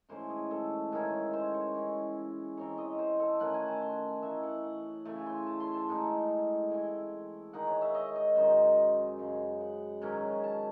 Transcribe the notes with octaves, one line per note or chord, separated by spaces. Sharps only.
G#2 E3 A3 C#4 C5
G#4
A4
D#3 G#3 C#4 E4
C5
C#5
E3 G#3 C#4
E3 C4 D#4 C#5
D#5
C5
A4
D#3 A3 C#4 F#5
G#5
A5
C6
A5
G#5
E3 A3 D#4 E5
F#5
F#5
C#3 E3 A3 E5
G#5
C6
A5
C6
A5
A2 G#3 D#4
E3 A3 C4 E4 G#5
D#3 G#3 D#4 F#5
C#5
E5
D#5
D#5
F#2 D#3 G#3 D#4 C5
F#2 C#3 G#3
F#5
G#2 D#3 F#3 C#4
A5